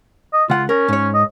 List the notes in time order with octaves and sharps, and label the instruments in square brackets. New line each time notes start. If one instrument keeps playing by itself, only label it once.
[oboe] D#5
[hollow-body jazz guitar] C#2 F#5 [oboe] F4
[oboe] C#4 [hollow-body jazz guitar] A#4
[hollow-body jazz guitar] G#2 C#5
[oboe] D#5